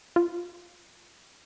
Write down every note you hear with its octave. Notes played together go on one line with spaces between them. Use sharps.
F4